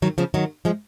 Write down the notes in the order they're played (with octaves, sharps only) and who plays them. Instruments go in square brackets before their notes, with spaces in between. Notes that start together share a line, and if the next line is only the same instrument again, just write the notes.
[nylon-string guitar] D#3 F#3
C#3 F3
D#3 F#3
F3 G#3